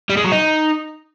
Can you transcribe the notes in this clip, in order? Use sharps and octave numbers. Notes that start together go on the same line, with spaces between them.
G3
G#3
F#3
D#4